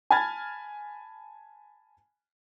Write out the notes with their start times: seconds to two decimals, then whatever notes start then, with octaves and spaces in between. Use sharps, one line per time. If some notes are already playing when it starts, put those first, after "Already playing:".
0.10 G#5 A5 B5 F6 G#6 A6